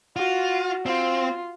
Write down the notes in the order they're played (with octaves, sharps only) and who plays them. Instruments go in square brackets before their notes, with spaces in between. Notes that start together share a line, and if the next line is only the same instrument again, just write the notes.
[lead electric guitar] F4 [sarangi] F#4
[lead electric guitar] C4 [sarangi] F4